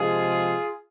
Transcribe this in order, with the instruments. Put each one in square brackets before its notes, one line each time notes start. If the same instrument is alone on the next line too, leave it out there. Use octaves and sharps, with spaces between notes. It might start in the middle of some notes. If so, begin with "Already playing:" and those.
Already playing: [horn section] C3 F3 G#3 F4 G#4